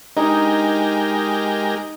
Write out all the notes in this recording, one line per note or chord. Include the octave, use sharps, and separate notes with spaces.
G#3 D#4 G4 A#4